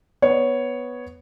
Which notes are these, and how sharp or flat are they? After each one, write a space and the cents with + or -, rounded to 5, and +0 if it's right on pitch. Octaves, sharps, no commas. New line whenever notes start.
B3 +0 C#5 +0